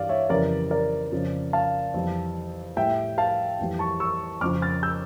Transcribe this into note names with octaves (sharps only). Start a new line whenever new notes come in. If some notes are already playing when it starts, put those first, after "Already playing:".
Already playing: G2 E3 G3 D5 F5
C#5 E5
F2 C#3 E3 G3 A#4 D5
A#4 D5
F2 C#3 F3
F5 A5
F2 E3 G3
A2 G3 E5 G5
F5 A5
F2 E3 G3
A5 C#6
C#6 E6
F2 C#3 F3 D6 F6
F6 A6
E6 G6